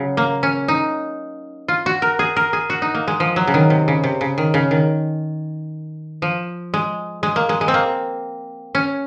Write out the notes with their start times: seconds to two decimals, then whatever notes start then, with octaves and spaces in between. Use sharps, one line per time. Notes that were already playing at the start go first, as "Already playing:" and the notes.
Already playing: C#3 F#3
0.17 A#3
0.43 C#4
0.68 D#4
1.68 F4
1.86 F#4
2.02 A#4
2.19 G#4
2.36 A#4
2.53 G#4
2.70 F#4
2.82 D#4
2.94 A#3
3.08 G#3
3.20 F3
3.36 F#3
3.47 C#3
3.54 D#3
3.70 C3
3.88 C#3
4.03 C3
4.21 C#3
4.38 D#3
4.54 C#3
4.71 D#3
6.22 F3
6.74 G#3
7.23 G#3
7.36 A#3
7.49 G#3
7.61 G#3
7.68 C4
7.74 A#3
8.75 C#4